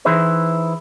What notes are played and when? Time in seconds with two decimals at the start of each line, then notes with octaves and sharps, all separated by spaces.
0.05 E3 D#4 E4 G#4 B4 C5